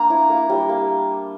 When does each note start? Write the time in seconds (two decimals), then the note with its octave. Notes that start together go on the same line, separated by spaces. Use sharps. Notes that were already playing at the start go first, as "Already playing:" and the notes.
Already playing: A#3 D4 A#5
0.10 E4
0.30 A#3
0.50 G3
0.69 A#3